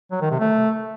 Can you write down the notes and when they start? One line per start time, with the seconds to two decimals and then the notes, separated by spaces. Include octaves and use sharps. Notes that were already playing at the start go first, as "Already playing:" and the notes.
0.12 F#3
0.21 D#3
0.31 C3
0.40 A3